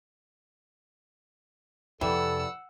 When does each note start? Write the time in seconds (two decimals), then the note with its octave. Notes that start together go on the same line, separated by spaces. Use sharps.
2.01 F2 C3 E3 G3 A4 F#5 E6